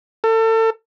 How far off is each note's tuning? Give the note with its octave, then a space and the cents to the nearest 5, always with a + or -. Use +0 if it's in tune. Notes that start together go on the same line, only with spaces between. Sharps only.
A4 +35